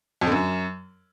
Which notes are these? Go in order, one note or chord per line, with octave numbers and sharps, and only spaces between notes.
F2
D3
F#2